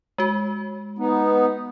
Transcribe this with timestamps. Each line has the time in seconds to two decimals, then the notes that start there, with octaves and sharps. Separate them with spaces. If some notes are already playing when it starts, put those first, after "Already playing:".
0.18 G#3 F#4
0.99 B3 D#4